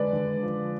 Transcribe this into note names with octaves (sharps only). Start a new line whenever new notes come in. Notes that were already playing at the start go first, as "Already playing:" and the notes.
Already playing: D3 G#3 B4 D5
D3
F3